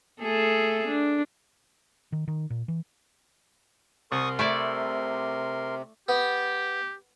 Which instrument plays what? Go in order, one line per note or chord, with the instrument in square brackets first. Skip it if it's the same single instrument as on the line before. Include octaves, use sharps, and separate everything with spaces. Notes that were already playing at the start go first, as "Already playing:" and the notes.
[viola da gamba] A3 G#4 A4
D4
[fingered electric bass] D#3
D#3
A#2
E3
[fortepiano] C2 [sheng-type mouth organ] A#4 C6 [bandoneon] C#6 D#6
[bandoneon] C3 [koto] A3 E4 D5
[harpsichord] B3 [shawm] G4